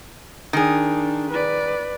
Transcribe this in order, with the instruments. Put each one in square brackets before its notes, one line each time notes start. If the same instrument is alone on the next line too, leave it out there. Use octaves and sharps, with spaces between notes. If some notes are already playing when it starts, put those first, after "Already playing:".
[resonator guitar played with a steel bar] D#3 G#4 [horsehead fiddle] D4
[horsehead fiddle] B4 D5